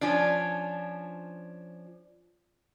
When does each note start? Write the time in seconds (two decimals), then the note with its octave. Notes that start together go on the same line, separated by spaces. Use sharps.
0.01 F3 C#4 D4